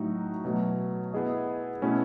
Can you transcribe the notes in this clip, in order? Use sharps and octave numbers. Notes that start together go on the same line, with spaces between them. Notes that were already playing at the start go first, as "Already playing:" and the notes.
Already playing: A2 F#3 A3 D#4 F#4
B2 F#3 A3
B3 E4 G#4 D#5
B2 A3 C#4 E4